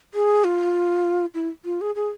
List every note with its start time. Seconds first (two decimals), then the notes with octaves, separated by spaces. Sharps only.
0.14 G#4
0.44 F4
1.34 E4
1.65 F4
1.81 G#4
1.95 G#4